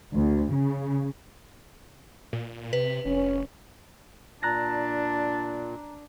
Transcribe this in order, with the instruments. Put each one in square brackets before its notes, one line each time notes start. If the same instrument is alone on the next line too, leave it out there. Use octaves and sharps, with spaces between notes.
[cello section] D2
C#3
[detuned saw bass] A#2
[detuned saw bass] C3 [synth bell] B4
[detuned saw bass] F1 [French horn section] C#4
[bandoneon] A#2 [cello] D4 [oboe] A5 [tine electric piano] A#5 F#6 A#6